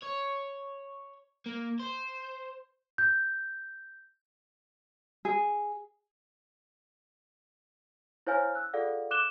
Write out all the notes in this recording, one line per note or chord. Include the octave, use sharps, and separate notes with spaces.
C#5
A#3
C5
G6
G#4
E4 C5 C#5 F5 G#5 F6
E6 F#6
F4 G#4 A4 D5 F5 F#5
D6 F#6 E7 G7